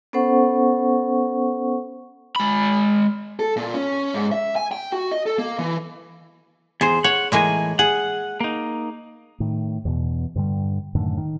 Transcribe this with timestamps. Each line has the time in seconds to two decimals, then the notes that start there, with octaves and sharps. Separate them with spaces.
0.13 B3 C#4 A4 C5 F#5 C#6
2.36 G#3 B5
3.40 A4
3.56 A#2
3.74 C#4
4.14 G#2
4.32 E5
4.56 G#5
4.72 G5
4.92 F#4
5.11 D#5
5.26 A4
5.38 A#3
5.59 E3
6.81 E2 G#4 C5
7.04 C#5 F#5
7.32 A2 E3 G#3 A#3 G#4 G#5
7.79 G#4 F#5
8.40 A#3 D#4
9.40 A2 D#3
9.85 E2 B2
10.36 G2 D3 G3
10.95 F#2 A2 D3 D#3
11.18 D#3